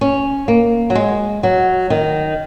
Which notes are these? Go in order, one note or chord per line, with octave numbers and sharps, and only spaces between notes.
C#4
A#3
F#3
G#3
F#3
D#3